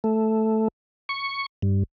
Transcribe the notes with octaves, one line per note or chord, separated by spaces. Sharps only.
A3
C#6
G2